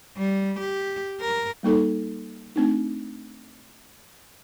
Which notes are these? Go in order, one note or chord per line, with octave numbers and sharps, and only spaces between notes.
G3
G4
A#4
G3 A#3 D#4 A4
A3 C4 D4 D#4